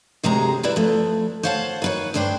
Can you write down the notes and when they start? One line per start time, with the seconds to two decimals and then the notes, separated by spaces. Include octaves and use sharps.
0.23 D2 C3 G#3 C#5 A#5
0.63 G3 E4 B4 D5 E5
0.76 F3 A3
1.43 C5 C#5 F5 F#5 G#5 A5
1.82 D#3 B4 C#5
2.14 D2 G2 D4 C5 G5